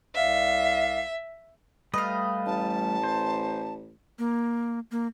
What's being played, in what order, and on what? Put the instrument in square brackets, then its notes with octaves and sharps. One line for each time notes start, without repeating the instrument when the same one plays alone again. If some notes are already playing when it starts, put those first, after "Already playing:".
[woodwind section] C2 D5 F5 [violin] E5
[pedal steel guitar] G3 A3 B4 [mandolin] D#5 F5
[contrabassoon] A1 [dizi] A5
[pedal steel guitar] C5
[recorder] A#3
A#3